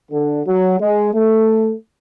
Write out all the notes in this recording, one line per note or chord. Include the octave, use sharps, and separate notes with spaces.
D3
F#3
G#3
A3